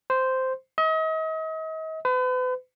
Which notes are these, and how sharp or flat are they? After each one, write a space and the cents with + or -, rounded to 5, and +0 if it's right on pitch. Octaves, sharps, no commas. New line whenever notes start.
C5 -5
D#5 +40
B4 +40